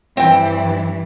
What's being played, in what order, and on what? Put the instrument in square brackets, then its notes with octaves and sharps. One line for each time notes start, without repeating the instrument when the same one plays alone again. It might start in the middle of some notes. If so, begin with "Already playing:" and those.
[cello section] G2 E3 [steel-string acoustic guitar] C4 G5